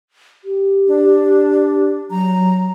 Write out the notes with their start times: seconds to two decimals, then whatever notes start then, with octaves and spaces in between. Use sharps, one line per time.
0.45 G4
0.87 D4
2.11 F#3 A#5